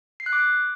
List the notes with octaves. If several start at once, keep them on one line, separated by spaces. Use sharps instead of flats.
C7
F#6
D6